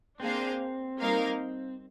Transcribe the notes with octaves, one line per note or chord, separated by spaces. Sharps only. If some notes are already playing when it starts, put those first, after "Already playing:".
A#3 C4 D4 G#4 C5 F5
G3 A#3 D#4 A#4 F5